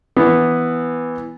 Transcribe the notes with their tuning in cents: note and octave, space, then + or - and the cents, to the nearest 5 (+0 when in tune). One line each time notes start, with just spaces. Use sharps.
E3 -5 B3 +0